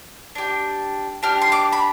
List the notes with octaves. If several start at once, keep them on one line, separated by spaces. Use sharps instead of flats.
D4 G4
D4 G4 F6
C6
D6
B5